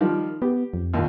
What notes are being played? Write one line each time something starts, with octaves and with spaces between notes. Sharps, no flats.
D#3 F3 G3
B3 G4
F2
A#1 D#2